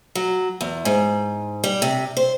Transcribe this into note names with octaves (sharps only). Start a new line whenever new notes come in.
F#3
E2
G#2
G3
C3
C5